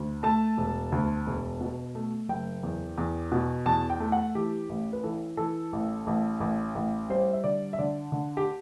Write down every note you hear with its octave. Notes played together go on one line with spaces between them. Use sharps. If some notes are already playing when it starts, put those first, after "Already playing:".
Already playing: D2
A3 A5
E1
D2
E1
B2
A3
F#1 G5
E2
E2
B2
E2 A5
G5
A3
F#5
E3 G4
A1
B4
E3 A4
E3 A4
A1
A1
A1
A1
G3 C5
E5
D3 D5
E5
D3 D5
D3
G4